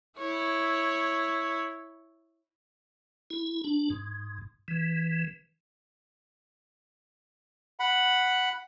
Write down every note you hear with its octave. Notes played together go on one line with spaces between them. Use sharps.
E4 C#5
E4
D4
G#2
E3
F#5 B5